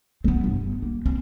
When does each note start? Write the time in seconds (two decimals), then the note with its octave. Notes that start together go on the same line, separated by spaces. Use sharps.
0.24 B3 C4
0.44 G1
0.83 A#3
1.06 C4